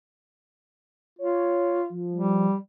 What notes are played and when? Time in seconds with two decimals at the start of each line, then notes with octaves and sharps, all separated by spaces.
1.19 F4 C#5
1.90 F3
2.13 G3